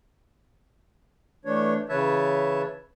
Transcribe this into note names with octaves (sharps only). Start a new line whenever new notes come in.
E3 A3 D4 C#5
C#3 E3 B4 C#5 E5 A5